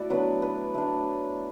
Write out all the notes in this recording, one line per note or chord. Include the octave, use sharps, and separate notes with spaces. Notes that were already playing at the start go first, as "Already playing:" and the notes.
Already playing: A3 E4 F#4 D5
F#3 B3 D4 B4
B4
A3 D4